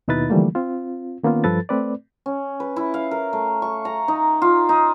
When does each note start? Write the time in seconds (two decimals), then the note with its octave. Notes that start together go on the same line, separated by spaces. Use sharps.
0.08 D#2 B2 D#4 E4 B4 A6
0.30 D3 E3 F3 G3 A3 A#3
0.55 C4 F4
1.23 D#3 A#3 B3 C#4 F4
1.44 G2 F3 A4 B4 A6
1.69 A3 C4 B4 D5
2.26 C#4
2.60 B4
2.76 E4
2.94 F5
3.11 A#4
3.33 A3
3.62 C#6
3.85 A#5
4.08 D#4
4.42 F4
4.69 D#4